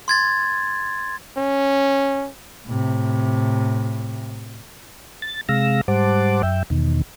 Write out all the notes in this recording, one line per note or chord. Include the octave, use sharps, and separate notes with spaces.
C6 G#6 A6
C#4
A2 C3
A6
C3 G#3 F5 E6 A#6
G#2 G3 C5 F#5 A5 D6
F#2 E5 G5
E2 B2 D#3